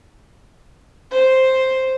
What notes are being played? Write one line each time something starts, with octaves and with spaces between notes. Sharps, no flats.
C5